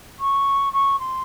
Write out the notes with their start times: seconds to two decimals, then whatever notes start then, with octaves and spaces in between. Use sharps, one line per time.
0.19 C#6
0.73 C#6
0.99 C6